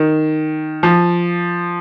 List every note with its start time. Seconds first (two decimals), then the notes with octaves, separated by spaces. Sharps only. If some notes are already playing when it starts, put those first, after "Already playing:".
Already playing: D#3
0.83 F3